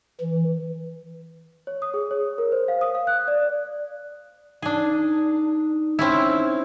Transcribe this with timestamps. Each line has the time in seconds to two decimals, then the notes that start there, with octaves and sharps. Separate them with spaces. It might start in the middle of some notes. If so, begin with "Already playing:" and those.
0.21 E3
1.67 C#5
1.82 D#6
1.94 G#4
2.11 C#5
2.38 A#4
2.52 C5
2.68 F5
2.81 D#6
2.95 F5
3.07 F#6
3.28 D5
4.62 D4 D#4 G#4
5.99 C4 C#4 E4